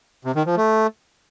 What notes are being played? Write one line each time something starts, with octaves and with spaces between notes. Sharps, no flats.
C3
D#3
F3
A3